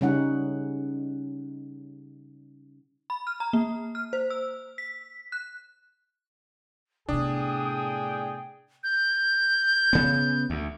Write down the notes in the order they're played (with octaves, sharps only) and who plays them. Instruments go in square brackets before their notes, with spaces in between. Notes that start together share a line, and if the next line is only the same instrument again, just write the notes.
[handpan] C#3 G3 C#4 D#4 F#5
[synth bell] B5
F6
A#5
A#3
F6
C5
E6
B6
F#6
[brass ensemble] A2 G#4 G5 [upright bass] C3 B3 [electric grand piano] D4 [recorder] D#6
[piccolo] G6
[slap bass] C#3 B3
D2